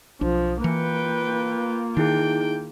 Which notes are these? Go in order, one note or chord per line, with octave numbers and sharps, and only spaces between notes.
B1 F3 D4
E3 A#3 F4 B4 G5 C#7
D#3 D#4 E4 G#4 G5